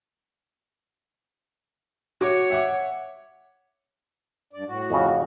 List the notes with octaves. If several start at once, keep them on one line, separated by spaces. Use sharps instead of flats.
F#4 C#5 D6
E5 F#5 D6
G2 D5
A2 F#4
F2 C#3